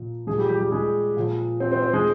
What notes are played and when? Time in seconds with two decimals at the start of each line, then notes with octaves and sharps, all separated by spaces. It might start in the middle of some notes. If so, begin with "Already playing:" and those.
Already playing: A#2 F3
0.27 A#2 F3 G#3 G#4
0.38 G3 G4
0.49 G3 G4
0.60 G3 G4
0.71 G#3 G#4
1.17 A#2 F3
1.60 C4 C5
1.72 C4 C5
1.82 C4 C5
1.93 G#3 G#4